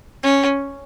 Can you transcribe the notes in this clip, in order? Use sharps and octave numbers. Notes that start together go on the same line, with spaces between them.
C#4